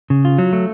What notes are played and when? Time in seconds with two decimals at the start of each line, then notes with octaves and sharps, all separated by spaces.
0.10 C#3
0.25 F4
0.39 F#3
0.53 A3